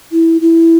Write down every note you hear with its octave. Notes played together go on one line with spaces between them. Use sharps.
E4
E4